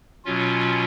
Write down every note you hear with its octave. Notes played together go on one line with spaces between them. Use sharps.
B2 F#3 C#4 F4